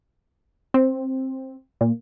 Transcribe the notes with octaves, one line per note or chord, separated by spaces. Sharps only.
C4
A#2